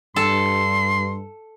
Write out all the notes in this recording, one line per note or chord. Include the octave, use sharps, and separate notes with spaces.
G2 A4 C6